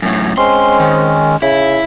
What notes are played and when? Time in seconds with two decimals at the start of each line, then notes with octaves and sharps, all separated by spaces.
0.02 F#2 A2
0.38 G#3 C4 C#4 C6
0.80 D#3
1.42 C#3 E4